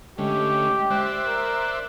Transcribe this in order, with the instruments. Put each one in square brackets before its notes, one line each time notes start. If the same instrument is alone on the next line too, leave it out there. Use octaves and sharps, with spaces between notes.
[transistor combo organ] D3 A3 C#4 [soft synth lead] G#3 [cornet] G4
[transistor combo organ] C5 D5 E5 [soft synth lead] F#6
[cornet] A#4